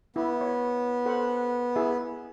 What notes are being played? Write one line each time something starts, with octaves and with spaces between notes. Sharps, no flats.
B3 E4
C#5
A4 C5 F#5
E4 G#4 E5